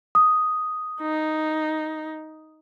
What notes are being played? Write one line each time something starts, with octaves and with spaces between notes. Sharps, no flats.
D#6
D#4